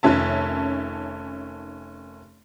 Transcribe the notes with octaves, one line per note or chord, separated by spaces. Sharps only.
F1 D#3 C#4 E5 A5